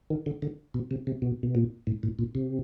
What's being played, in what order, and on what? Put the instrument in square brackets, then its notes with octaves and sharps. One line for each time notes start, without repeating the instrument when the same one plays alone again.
[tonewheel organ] D#3
D3
D3
B2
C3
C3
B2
B2
A#2
A2
A2
A#2
C3